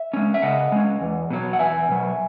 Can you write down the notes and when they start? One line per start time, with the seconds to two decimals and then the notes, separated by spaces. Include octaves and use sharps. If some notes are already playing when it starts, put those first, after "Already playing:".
Already playing: E5
0.14 G#3 C#4
0.34 E5
0.42 C#3 D#5 F#5
0.72 G#3 C#4
1.01 E2
1.30 B2 F#3
1.53 F#5
1.59 E2 E5 G#5
1.89 B2 F#3